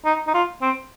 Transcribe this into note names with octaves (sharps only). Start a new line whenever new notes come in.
D#4
D#4
F4
C4